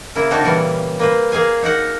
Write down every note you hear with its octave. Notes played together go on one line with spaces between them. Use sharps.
C#3 A#3 E4
D3 C4 D4 D#4 F#4 C#5
A#2 C#3 E3 G3 C#4
A#3 B4 C5
A#3 G#4 F5 G#5
D#4 F#4 A#4 F#5